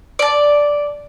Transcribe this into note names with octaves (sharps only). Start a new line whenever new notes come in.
D5 A5